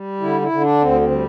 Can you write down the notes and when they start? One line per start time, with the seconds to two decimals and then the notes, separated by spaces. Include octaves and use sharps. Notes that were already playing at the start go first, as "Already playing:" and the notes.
Already playing: G3
0.21 D3 E4
0.41 E4
0.51 D3
0.61 D4
0.81 D2 C4
1.01 C4
1.11 G3